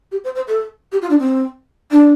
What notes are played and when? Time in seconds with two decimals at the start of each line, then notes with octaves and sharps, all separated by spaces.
0.11 G4
0.24 C5
0.35 C5
0.47 A4
0.92 G4
1.02 F4
1.10 D4
1.19 C4
1.91 D4